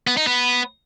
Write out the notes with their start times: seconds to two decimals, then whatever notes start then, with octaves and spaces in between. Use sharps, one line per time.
0.07 B3
0.17 D#4
0.27 B3